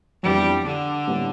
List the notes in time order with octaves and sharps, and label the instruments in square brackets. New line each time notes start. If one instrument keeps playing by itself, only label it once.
[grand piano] F2 E3 B3 D4 [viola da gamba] G3
[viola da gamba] D3
[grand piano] A2 G3 B3 D4